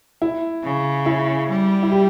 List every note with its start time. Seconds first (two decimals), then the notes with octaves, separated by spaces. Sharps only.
0.22 E4
0.64 C#3
1.06 E4
1.49 G3
1.83 E4
1.91 G4